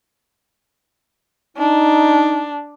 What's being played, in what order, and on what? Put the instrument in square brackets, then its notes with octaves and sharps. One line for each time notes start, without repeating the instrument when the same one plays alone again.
[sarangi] D4 [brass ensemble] D#4